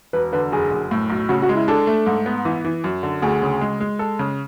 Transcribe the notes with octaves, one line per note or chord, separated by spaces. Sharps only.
E1 B4
D3 B4
F#1 G#4
F#1
A2
B1
C#3 F#4
F#4
G#3
E4
D4 A4
A3
G#2
B3
E3
E3
F#2
D3
D2 G#4
C#3
G#3
G#3
A4
C#3